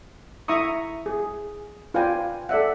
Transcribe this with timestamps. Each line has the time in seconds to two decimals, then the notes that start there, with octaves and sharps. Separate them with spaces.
0.48 E4 E5 A#5 C#6 D#6
1.06 G#4
1.94 F4 B4 D5 F5 G5 G#5
2.49 A4 D5 E5 F#5